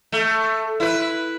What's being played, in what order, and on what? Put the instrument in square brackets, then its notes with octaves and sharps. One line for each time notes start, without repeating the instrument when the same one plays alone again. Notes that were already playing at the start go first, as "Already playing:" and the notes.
[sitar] A3
E4 B4